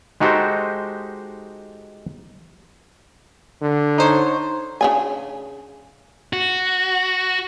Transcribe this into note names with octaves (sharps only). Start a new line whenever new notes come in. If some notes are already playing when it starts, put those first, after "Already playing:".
G#3 D#4 F#4 G4 A4 C5
D3
D#4 C5 C#5
C#3 D4 G#5
F#4